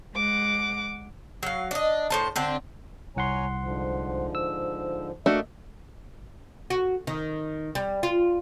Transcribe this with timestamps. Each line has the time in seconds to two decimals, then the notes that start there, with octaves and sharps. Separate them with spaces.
0.15 G#3 F#5 D6
1.43 F#3 F5
1.71 D4 D#5
2.10 A2 C5 A5
2.36 D3 C4 D4
3.16 C2 C#5 F#5 G#5 A#5 C6
3.63 G#2 D3 F3
4.35 E6
5.26 A3 A#3 D4 F#4 D#5 E5
6.70 F#4
7.07 D#3
7.75 G3
8.03 F4